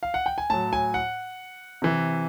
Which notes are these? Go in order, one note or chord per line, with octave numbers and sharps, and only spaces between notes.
F5
F#5
G5
G#5
A2 F#3 A5
G#5
F#5
C3 E3